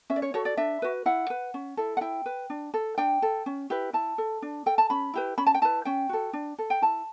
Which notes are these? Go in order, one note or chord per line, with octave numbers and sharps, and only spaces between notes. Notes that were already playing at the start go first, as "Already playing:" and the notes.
C#4 E5
D5
C#5
F#4 A4 C#5
D5
D4 E5
F#4 B4
E4 F#5
B4
C#4
E4 A4
F#5
E4 G5
B4
D4
A4
D4 G5
A4
C#4
E4 G4 B4
E4 A5
A4
D4
A4 G5
A5
C#4 B5
E4 G4 B4
C#4 B5
A5
G5
E4 B4 A5
C#4 G5
F#4 A4
D4
A4
G5
E4 A5